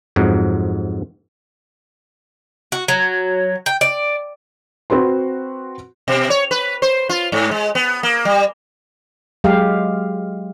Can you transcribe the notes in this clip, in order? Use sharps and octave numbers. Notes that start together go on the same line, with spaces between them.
F2 G#2 F#3
F#4
F#3
G5
D5
C4 F#4 B4 C6
B2
C#5
B4
C5
F4
G#2
G#3
B3
A#3
G3
F#3 G#3 G4 F5